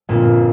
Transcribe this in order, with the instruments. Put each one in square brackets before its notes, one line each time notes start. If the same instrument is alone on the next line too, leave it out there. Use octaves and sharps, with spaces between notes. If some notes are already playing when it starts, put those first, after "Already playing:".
[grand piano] G1 F2 F3 A#3 [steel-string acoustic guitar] A#2